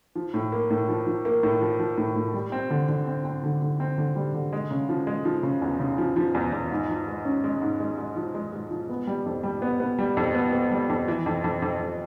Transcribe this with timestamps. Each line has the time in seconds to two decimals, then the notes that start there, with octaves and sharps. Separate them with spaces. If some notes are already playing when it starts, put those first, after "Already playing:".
0.16 F3
0.34 A2
0.52 A#3
0.70 A2
0.89 F3
1.07 F3
1.25 A#3
1.43 A2
1.61 F3
1.79 F3
1.98 A2
2.16 A2
2.34 G3
2.52 C4
2.70 D3
2.89 D3
3.07 C4
3.25 C4
3.43 D3
3.62 D3
3.80 C4
3.98 D3
4.16 G3
4.34 D3
4.53 G#3
4.71 C#3
4.89 F3
5.07 G#3
5.25 F3
5.43 C#3
5.62 E2
5.80 C#3
5.98 F3
6.16 F3
6.35 E2
6.53 E2
6.71 G#2
6.89 F3
7.08 G#3
7.25 C#4
7.44 G#3
7.62 G#2
7.80 G#3
7.98 G#3
8.16 F3
8.35 G#3
8.53 G#3
8.71 F3
8.90 B3
9.07 G3
9.26 F2
9.43 G3
9.62 B3
9.80 B3
9.99 G3
10.17 F2
10.35 B3
10.53 B3
10.71 G3
10.89 F2
11.08 E3
11.26 F2
11.44 F2
11.62 F2
11.80 F2